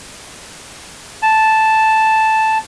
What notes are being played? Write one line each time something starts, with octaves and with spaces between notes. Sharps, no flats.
A5